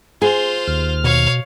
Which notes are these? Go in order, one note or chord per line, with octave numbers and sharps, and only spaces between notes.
F4 G#4 C5
D#2 F6
B2 C#5 F5